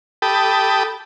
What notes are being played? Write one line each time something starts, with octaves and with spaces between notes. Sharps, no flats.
G4 A4 G5 A5 B5 D#6